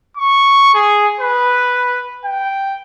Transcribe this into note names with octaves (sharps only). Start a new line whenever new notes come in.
C#6
G#4
B4
G5